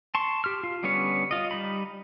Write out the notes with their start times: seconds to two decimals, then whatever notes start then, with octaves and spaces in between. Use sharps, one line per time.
0.15 A5 C6 C#6
0.44 G4 F6
0.63 F4
0.83 D3 G3 B3 C#4 C#5
1.31 F4 D#5
1.51 G3 D#4 B5